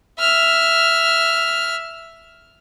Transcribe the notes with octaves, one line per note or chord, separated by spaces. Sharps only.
E5 F6